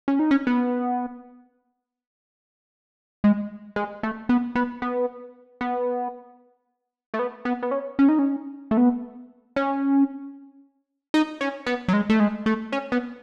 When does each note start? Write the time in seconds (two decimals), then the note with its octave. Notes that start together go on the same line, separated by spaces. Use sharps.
0.08 C#4
0.19 D#4
0.31 C#4
0.47 B3
3.24 G#3
3.76 G#3
4.03 A3
4.29 B3
4.55 B3
4.82 B3
5.61 B3
7.14 A3
7.19 B3
7.45 B3
7.63 B3
7.71 C#4
7.99 C#4
8.09 D#4
8.19 C#4
8.71 A3
8.77 B3
9.56 C#4
11.14 D#4
11.41 C#4
11.66 B3
11.88 F#3
11.93 G#3
12.10 A3
12.20 G#3
12.46 A3
12.72 C#4
12.92 B3